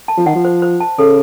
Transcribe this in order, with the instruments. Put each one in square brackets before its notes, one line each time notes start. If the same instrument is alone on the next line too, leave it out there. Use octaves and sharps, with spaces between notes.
[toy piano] A5
[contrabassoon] F3
[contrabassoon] D#3 [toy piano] F#5
[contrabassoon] F3
[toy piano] C5
C5
A5
[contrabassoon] C#3 [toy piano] A4